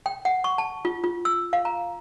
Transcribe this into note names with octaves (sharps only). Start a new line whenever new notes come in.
G5
F#5
C#6
A5
F4
F4
E6
F5
A#5